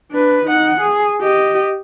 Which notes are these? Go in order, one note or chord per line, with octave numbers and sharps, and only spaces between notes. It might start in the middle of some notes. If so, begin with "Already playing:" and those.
D4 B4
D#4 F#5
G#4
G4 D#5